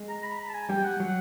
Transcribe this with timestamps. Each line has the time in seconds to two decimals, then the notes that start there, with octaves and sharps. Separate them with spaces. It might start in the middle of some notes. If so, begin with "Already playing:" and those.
Already playing: G#3
0.09 A#5
0.23 B5
0.39 A#5
0.49 A5
0.53 G#5
0.70 G3 G5
0.85 F#5
1.00 F#3